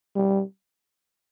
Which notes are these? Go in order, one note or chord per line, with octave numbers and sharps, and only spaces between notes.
G3